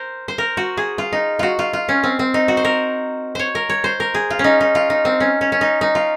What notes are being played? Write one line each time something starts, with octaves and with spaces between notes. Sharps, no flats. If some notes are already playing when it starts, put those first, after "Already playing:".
Already playing: A#4 C5
C5
A#4
F#4
G#4
F4
D#4
F4 F#4
F4
F4
C#4
C4
C4
D#4
F#4
C5
A#4
C5 C#5
A#4
C#5
C5
A#4
G#4
F4
C#4
D#4
D#4
F4
D#4
C4
C#4
C#4
C#4
D#4
D#4
F4